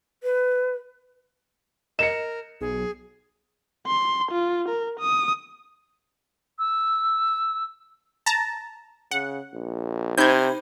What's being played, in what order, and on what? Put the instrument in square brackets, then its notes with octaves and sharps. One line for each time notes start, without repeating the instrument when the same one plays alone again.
[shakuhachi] B4
[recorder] A#4 [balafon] D#5 [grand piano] C#7 E7
[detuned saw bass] B1 [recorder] G#4
[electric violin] C6
F4
A#4
D#6
[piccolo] E6
[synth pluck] A5 A#5
[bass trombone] C#3 [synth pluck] F#5
[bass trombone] A#1
[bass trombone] C3 [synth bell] D#4 C5 B5 [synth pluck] G6 G#6